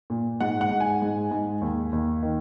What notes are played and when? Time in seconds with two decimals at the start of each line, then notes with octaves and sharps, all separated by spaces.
0.10 A#2
0.40 G#2 F#5
0.61 F#5
0.71 G#2
0.80 G#5
1.02 G#2
1.31 G#2
1.62 D#2
1.92 D#2
2.23 D#3